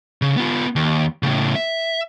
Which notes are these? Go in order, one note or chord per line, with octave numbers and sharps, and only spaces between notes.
C#3
B3 F4
D#2
A2 C#3
E5